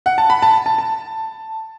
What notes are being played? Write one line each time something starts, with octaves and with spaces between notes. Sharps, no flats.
F#5
A5
B5
A5
A5
A5